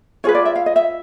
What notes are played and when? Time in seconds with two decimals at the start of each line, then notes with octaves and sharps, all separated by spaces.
0.24 F4 G#4 B4 C#5
0.35 D5
0.45 E5
0.56 F5
0.66 D#5
0.76 E5